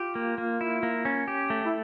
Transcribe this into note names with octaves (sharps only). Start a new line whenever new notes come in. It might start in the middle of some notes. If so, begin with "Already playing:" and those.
Already playing: F4 G4
A#3
A#3
E4
A#3
C#4
G4
A3
E4